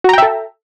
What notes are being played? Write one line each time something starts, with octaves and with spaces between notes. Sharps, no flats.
F#4 A4 E5 G5 A#5